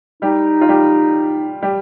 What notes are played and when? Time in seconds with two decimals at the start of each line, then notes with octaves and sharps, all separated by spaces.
0.22 G3 D#4 G4
0.61 F4
0.68 G3 G4
1.62 G3 G4